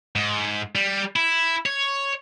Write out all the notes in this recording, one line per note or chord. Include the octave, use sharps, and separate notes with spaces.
G#2
G3
E4
C#5